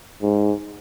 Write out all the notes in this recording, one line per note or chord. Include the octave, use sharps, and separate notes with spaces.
G#2